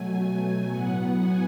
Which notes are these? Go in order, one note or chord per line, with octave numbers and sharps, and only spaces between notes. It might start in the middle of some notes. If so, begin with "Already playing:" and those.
Already playing: B2 F#3 A3 G#5
A2 F#3 B3 F#5
G#5